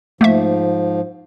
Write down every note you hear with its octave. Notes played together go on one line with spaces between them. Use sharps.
G#2 F3 A3 A#3 E5